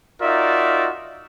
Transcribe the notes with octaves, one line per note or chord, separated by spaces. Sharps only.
D#4 F4 F#4 A#4 D5 E5